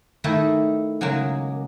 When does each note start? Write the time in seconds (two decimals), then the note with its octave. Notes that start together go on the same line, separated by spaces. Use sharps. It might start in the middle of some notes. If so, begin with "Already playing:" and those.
0.24 D#3 A3 A#3 E4 A4
1.01 C#3 F#3 G#3 A#3